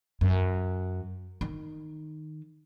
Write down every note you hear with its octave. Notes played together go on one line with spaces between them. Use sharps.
F#2
D#3